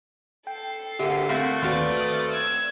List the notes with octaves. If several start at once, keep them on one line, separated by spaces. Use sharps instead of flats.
A4 G5 C7
D2 D3 A#3 G4 E5
A3 C4 E4 F#4 F5
D#2 C4 F4 F#4 B4 D5 F5
D#6 F6
E6 G#6